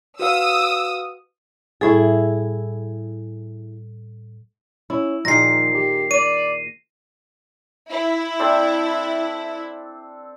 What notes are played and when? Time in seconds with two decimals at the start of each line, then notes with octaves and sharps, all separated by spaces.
0.19 F#4 B4 F5 D#6 E6
1.81 A2 G3 E4 G#4 A4
4.90 C#4 E4
5.25 A#2 D#3 F3 G#4 A#6 C7
5.75 G4
6.11 D5 D#7
7.90 E4
8.39 C4 D4 A4